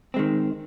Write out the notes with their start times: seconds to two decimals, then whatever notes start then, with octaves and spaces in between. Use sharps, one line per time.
0.14 D#3 G#3 C4